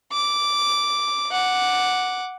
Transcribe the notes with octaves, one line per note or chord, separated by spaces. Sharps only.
D6
F#5 D6